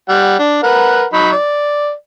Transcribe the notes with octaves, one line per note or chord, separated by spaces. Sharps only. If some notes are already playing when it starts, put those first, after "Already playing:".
G3 F#5
D4
A#4 B4 F#5
F#3 D#4 B5
D5